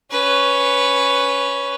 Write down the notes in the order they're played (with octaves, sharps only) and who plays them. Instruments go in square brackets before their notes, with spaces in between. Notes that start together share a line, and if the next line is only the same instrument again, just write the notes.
[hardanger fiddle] C#4 B4